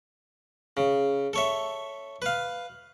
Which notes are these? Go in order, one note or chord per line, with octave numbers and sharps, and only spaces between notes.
C#3
A4 C#5 E5
B4 F5